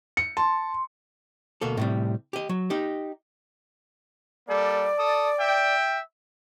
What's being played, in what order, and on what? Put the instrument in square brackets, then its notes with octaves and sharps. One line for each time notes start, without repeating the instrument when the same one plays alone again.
[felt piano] C#7
[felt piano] A5 [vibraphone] C6
[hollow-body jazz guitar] D2 B2 A#3 A4
A2 C3 G3
G4 D#5
F#3
D#4 G4
[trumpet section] G3 A#3 A4 [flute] D5
[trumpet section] A4 A5 D#6
E5 G5